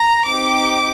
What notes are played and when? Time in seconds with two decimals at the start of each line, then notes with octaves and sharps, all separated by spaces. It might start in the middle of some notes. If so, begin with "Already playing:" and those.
Already playing: A#5
0.27 C4 D#4 G4 D6